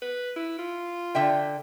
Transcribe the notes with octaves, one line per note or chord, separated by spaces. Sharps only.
B4
E4
F4
D3 E5 G5